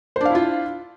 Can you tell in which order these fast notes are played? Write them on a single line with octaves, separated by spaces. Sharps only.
C5 D4 F5 E4 F4